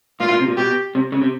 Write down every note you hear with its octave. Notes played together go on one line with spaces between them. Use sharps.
A#2 F4
A#2
C3
A#2
B2 G4
C3
C#3
C3